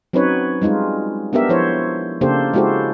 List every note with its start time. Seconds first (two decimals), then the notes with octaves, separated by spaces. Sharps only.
0.13 F#3 C4 C#4 D#4 B4 C#5
0.62 G3 G#3 D#4 F4
1.33 B3 D4 G4 A#4 E5
1.49 F3 E4 C5 C#5
2.21 C#3 A#3 D4 G4 A4 C5
2.54 G#3 E4 F#4 G4 A4 C5